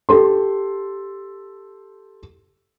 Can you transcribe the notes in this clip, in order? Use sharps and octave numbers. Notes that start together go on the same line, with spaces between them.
G4 A4 C6